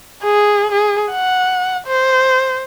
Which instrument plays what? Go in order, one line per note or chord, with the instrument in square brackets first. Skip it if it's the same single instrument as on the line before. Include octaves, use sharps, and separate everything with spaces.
[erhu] G#4
G#4
F#5
C5